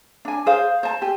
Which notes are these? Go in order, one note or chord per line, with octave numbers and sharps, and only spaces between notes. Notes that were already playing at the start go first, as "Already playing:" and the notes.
D4 G#5
G#4 C5 F5
C5 A5
G4 G#5